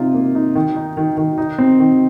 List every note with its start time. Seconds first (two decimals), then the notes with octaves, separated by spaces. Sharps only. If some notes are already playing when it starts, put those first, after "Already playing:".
Already playing: C3 D#4 F4
0.14 A#3
0.35 D#4
0.55 D#3
0.76 D#4
0.97 D#3
1.17 D#3
1.38 D#4
1.58 C4
1.79 D#3